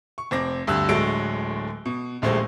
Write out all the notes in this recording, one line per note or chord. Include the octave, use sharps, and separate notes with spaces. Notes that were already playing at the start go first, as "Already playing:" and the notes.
C#6
F1 C4 D6 A#6
D2 G2 E6 F#6
D1 D3 F#3 G#3 A3 D7
B2
D#1 A#1 G#3 A3 G4 C5